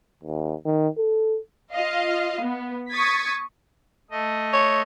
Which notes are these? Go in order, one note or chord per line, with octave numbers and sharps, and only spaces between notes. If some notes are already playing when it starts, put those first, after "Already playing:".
D#2
D#3
A4
F4 D#5 F5
B3
C#6 D#6 G#6 A6 B6
A3 D#5
C#5